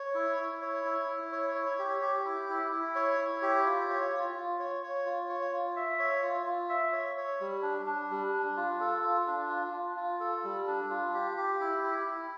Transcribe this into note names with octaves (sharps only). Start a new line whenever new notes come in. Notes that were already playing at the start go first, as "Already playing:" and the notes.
Already playing: C#5
E4
E4
C#5
E4
E4
C#5
C#5
G4
G4
E4
E4
E4
C#5
E4
G4
F4
C#5
F4
F4
C#5
C#5
F4
C#5
F4
E5
C#5
F4
F4
E5
C#5
C#5
G3
D4
D4
G3
D4
F4
A4
F4
D4
F4
F4
F4
A4
G3
D4
F4
G4
G4
E4
E4
E4